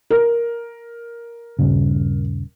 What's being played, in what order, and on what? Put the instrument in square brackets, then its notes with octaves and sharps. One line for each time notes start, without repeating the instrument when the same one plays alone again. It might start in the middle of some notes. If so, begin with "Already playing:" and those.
[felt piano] A#4
[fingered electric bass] D#1 G2 C#3